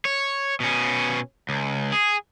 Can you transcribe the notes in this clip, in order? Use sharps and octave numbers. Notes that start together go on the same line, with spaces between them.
C#5
B2 C#4
C#2
G#4